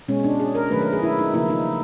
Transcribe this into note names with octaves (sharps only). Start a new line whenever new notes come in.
B2 G#3 C#4
D4
G#4
A#4
D#3 F#3 A3 B4
A#4
G#4
E4
D#4
C#3 F3 A#3 E4
D#4